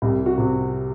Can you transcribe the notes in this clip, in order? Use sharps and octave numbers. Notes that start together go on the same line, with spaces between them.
C2 G4
F#4
C3 F#4